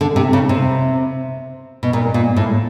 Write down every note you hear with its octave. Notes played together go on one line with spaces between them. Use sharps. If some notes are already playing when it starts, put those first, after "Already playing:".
D3
C3
C#3
C3
B2
A#2
A#2
A2